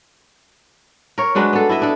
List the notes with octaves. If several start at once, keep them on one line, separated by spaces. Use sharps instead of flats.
A#4 C#5
F#3 G#3 D4 B4
B3 A4
E4 A4 D#5 E5
D4 A4